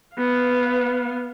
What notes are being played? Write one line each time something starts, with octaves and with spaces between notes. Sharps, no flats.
B3 F5